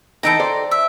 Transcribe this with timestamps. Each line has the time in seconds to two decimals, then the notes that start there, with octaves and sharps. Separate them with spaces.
0.23 E3 D#4 A4 B4 G5 A#5
0.40 C5 D5
0.71 E5